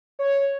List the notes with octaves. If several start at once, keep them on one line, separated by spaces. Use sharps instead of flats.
C#5